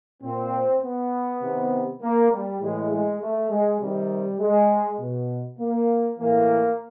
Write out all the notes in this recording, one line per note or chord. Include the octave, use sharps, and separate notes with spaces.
A#2 C4
B3
C3 D#3
A#3
G3
A2 E3 G#3
G#3
A3
G#3
C3 D#3 G3
G#3
B2
A#3
A2 E3 A#3